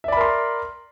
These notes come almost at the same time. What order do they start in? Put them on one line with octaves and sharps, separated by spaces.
E5 D5 B5 A#4 C6